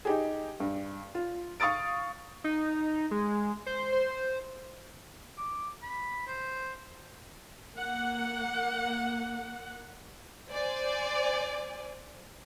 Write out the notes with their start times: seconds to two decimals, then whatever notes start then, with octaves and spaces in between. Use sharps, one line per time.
0.05 D#4 G4 G#4
0.60 G2
1.15 F4
1.60 F5 C#6 D#6 A6 D7
2.44 D#4
3.11 G#3
3.66 C5
3.92 C5
5.38 D6
5.82 B5
6.27 C5
7.76 A#3 F#5
10.50 C5 D5 G#5